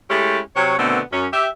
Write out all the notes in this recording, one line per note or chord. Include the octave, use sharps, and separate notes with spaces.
G#3 A3 C#4 E4 G4
C3 F#3 C4 C#5
B2 D3 D#3 A3 B3 C4
F#2 C#4
G4 E5